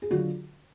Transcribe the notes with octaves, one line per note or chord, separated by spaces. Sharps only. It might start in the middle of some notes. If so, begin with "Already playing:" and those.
G#4
D3 F#3 D4 F4 F#4